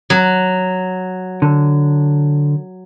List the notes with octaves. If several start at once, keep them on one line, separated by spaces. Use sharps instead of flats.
F#3
D3